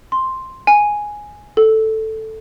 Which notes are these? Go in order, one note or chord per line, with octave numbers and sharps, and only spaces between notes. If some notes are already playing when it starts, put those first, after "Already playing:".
C6
G#5
A4